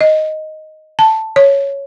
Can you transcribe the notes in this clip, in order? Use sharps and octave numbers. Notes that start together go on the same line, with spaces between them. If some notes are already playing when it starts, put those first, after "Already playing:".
D#5
A5
C#5